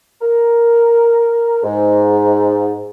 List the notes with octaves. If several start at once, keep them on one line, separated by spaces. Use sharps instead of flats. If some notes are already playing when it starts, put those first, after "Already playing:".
A#4
G#2